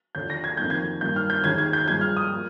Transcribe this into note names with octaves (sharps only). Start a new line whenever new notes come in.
D#2 D3 F3 G6
A#6
G#6
F2 D#3 A#3 G6
G#6
G2 D#3 A#3 G6
F6
G6
D#2 D#3 G#3 G#6
G#6
G6
G2 F3 G#3 G#6
F6
D#6
F3 A#3